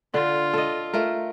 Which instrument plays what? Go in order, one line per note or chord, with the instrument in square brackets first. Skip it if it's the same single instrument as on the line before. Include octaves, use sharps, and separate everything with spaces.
[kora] D3 [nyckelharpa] F4
[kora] A4 D#5
A3 F4 A#4